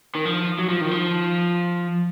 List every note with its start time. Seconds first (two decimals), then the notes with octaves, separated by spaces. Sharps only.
0.15 D#3
0.25 F3
0.59 F#3
0.69 F3
0.81 D#3
0.91 F3